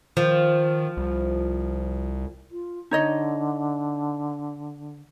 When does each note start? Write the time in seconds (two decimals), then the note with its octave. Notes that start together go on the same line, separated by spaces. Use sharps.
0.17 D#3 F3
0.97 C2
2.52 F4
2.91 D3 D#4 C#5 D#5